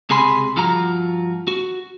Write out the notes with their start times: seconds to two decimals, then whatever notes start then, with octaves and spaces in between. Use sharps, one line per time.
0.10 C#2 C3 G#4 G#5 B5 C6
0.56 G2 F3 F4 F#4 A#5
1.48 F#4